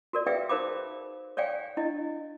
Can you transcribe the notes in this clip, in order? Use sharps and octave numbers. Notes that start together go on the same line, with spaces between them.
F#4 A#4 D5
G#4 B4 D5 E5 F5 G5
D#4 A#4 C5 F5 B5 D6
C#5 D5 F5 G5 G#5
D4 E4 D#5